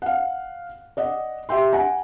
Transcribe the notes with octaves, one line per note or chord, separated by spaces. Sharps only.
F5 F#5
D5 D#5 F#5
G4 E5 G5 C6
F#5 G#5 A#5